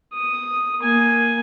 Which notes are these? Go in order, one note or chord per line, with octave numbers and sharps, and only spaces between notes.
D#6
A#3 G#5